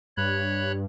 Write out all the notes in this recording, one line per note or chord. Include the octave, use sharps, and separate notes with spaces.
G2 C#5 B5 F#6